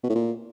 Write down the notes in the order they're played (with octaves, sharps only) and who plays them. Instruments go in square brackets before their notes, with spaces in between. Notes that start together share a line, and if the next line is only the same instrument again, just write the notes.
[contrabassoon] B2
A2
A#2